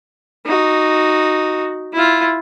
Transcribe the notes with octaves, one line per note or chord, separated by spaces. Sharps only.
D#4 F#4
E4 F4